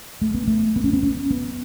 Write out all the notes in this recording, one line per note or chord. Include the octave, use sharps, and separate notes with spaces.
A3
B3
A3
B3
C#4
B3
C#4
B3